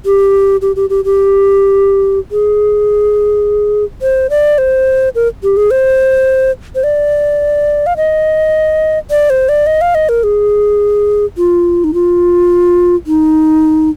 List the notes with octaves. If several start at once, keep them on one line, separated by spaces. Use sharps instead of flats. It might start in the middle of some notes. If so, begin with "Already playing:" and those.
G4
G4
G4
G4
G4
G#4
C5
D5
C5
A#4
G4
G#4
C5
C5
D5
F5
D#5
D5
C5
D5
D#5
F5
D#5
A#4
G#4
F4
D#4
F4
D#4